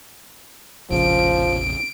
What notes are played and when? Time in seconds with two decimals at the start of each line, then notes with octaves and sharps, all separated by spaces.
0.90 F1 A#1 C#3 F3 D7